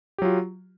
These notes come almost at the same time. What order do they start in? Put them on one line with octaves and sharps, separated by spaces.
G4 F#3 F4